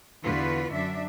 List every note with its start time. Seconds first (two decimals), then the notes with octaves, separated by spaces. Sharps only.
0.23 E2 D3 F4 F#4 B4
0.72 F#2 D4 E5